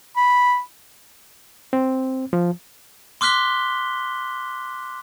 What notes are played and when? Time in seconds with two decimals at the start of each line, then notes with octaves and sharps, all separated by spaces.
0.17 B5
1.73 C4
2.33 F3
3.21 C6 D6 F6 F#6 B6 G7